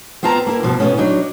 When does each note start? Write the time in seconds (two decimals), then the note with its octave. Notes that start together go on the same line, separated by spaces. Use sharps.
0.23 B3 C4 F4 A5 A#5
0.46 A#3 E4 A#4
0.63 G2 B2 F3
0.80 B2 E3 G3 A3 B3 C#4
0.98 F#3 D4 D#4